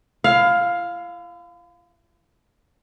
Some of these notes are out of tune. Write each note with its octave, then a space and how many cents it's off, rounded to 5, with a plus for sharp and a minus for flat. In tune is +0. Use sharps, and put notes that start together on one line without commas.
E4 +45 F5 +10